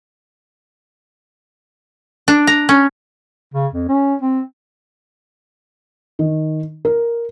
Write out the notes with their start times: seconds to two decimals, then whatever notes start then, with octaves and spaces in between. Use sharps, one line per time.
2.28 D4
2.47 A#5
2.69 C#4
3.54 C#3
3.73 F2
3.89 C#4
4.22 C4
6.19 D#3
6.85 A#4